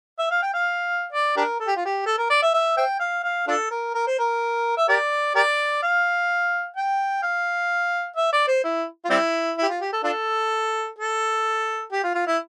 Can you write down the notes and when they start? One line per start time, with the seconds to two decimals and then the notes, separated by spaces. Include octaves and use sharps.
0.19 E5
0.31 F5
0.42 G5
0.54 F5
1.13 D5
1.36 D4 G4 A#4
1.60 A4
1.67 G4
1.76 F4
1.85 G4
2.06 A4
2.18 A#4
2.30 D5
2.42 E5
2.54 E5
2.77 C5 E5 G5
3.00 F5
3.24 F5
3.48 D4 F4 A4
3.71 A#4
3.94 A#4
4.07 C5
4.18 A#4
4.77 E5
4.88 G4 A#4 D5
5.35 G4 A#4 D5
5.82 F5
6.76 G5
7.23 F5
8.16 E5
8.32 D5
8.47 C5
8.64 E4
9.05 F4
9.10 G3 C4 E4
9.58 E4 G4
9.69 F4
9.81 G4
9.93 A4
10.04 D4 F4 A4
10.98 A4
11.92 G4
12.04 F4
12.15 F4
12.27 E4